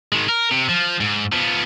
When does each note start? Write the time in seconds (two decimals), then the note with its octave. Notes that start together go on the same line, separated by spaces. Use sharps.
0.12 D#3 G#3
0.29 A#4
0.51 C3
0.69 F3
1.00 G#2
1.32 F3 B3